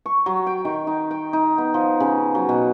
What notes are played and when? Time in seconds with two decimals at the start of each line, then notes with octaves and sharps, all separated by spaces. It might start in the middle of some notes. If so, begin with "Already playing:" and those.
0.06 C#6
0.26 F#3
0.46 G5
0.65 D#3
0.87 D#4
1.11 G5
1.33 D#4
1.58 B3
1.74 F3
2.00 C#3
2.35 F#3
2.49 B2